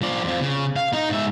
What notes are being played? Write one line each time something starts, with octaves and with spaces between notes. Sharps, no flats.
F3 D5
F2 F3
C#3
F5
D#4
G#2 E5